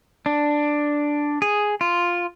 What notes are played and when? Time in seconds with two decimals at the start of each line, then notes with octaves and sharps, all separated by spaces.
0.26 D4
1.42 G#4
1.81 F4